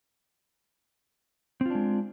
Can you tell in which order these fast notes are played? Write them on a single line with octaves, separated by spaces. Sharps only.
C4 F4 D4 G#3